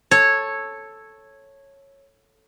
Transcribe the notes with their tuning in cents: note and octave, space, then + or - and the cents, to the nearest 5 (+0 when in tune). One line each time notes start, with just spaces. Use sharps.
A4 +0 C#5 -10